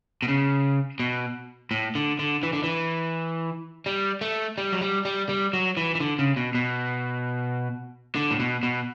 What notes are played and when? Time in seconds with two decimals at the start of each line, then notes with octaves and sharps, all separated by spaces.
0.22 B2
0.28 C#3
1.00 B2
1.71 A2
1.95 D3
2.19 D3
2.43 E3
2.53 D3
2.63 E3
3.86 G3
4.21 A3
4.58 G3
4.72 F#3
4.81 G3
5.05 G3
5.29 G3
5.53 F#3
5.77 E3
5.95 E3
6.00 D3
6.19 C#3
6.37 B2
6.55 B2
8.15 D3
8.31 A2
8.39 B2
8.63 B2